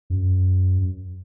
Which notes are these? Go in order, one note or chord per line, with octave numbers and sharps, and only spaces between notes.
F#2